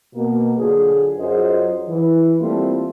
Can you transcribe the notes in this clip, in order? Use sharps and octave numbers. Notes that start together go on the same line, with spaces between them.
B2 A#3
D3 F#3 F4 G#4
F#2 F#3 F4 G#4 C5 D#5
E3
G3 A3 A#3 C4 E4 F4